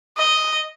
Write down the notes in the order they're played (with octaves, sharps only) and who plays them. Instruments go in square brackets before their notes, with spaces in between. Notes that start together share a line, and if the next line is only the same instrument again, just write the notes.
[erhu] D#5